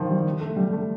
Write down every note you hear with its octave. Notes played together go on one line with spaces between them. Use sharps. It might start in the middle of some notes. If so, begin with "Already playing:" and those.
Already playing: D#3 F3
G3
A3
G3
A3